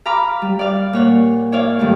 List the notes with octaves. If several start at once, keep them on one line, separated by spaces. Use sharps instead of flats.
F5 A#5 B5 D6 F6
G3
D5 F5 F6
A#2 C#5 F#5
E4 C#5 D5 F5
G2 D#3 F3 A3